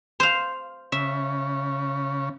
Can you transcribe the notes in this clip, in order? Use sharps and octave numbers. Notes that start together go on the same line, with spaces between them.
C5 F5
C#3 E5